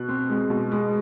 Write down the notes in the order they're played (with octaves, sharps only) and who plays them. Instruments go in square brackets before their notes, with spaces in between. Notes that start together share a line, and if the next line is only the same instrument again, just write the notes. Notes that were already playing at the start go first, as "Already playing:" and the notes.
Already playing: [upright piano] B2 F#6
C4
G#3
B2
G#3